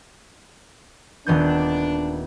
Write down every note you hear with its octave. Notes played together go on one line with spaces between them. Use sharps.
D#1 B3 D4 G6